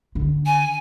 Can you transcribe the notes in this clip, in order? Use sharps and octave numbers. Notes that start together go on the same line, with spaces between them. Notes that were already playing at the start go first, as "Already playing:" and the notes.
D3
G#5